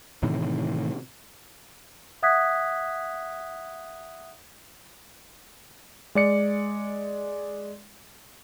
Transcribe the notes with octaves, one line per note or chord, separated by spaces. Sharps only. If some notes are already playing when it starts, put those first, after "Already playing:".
A2 C3 D#3 E3
E5 F#5 D#6 F#6 G#6 B6
G#3 D5 C#7